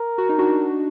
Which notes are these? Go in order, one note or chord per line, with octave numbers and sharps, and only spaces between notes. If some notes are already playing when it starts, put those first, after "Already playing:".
Already playing: A#4
F#4
D#4
D4 F#4